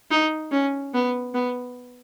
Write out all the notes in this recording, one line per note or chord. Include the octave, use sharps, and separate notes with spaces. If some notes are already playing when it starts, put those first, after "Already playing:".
D#4
C#4
B3
B3